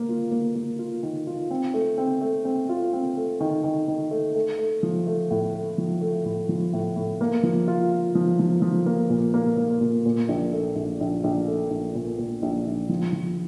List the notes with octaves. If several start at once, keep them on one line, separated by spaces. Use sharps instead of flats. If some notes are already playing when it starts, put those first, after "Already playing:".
Already playing: A#3
F4
A#3
A#3
F4
D#3
F4
C4
A3
C4
A3
C4
F4
C4
A3
D#3
D#3
D#3
A3
A3
A3
F3
A3
A2
A3
F3
A3
A2
F3
A2
A2
A#3
F3
F4
F4
F3
F3
F3
A#3
A#2
A#3
A#3
A#2
A#2
A#1
A3
A#1
A#1
A#1
A3
A#1
A#2
A#2
A#1
A#1
F3
F3